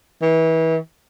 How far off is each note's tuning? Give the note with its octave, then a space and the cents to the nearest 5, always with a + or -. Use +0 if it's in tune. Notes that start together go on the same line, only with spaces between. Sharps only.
E3 -30